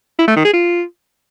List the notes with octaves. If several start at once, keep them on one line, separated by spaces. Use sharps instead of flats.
E4
A3
D#3
G#4
F4